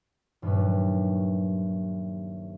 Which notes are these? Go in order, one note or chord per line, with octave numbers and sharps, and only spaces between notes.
D#1 G2 F#3 B4